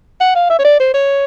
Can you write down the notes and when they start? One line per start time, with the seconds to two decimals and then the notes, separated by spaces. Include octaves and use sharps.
0.20 F#5
0.35 F5
0.50 E5
0.59 C#5
0.65 D5
0.80 C5
0.94 C#5